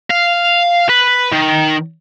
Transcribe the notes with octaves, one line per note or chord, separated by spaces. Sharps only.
F5
B4
D#3